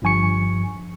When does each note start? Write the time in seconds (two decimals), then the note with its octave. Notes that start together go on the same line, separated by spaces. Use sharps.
0.02 G1 G2 F3 G#5 C#6 C#7